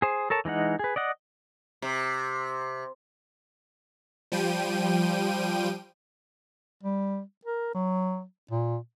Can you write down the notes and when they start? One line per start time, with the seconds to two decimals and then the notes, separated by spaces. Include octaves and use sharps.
0.02 G#4 C5
0.30 A4 A#4 C#5 A5
0.45 E3 G#3 D#4 F#5
0.79 G#4 B4
0.96 D5 D#5 F#5
1.82 C3
4.32 F3 G3 G5 D#7
6.83 G3
7.45 A#4
7.75 F#3
8.51 A#2